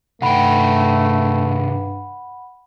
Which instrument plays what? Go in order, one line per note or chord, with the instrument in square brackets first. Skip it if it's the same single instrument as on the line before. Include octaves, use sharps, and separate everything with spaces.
[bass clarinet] G2 [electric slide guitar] C3 D#3 G5 [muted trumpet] A3 [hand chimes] F#5 B5